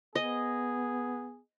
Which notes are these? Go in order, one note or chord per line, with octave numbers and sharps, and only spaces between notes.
B3 G#4 D#5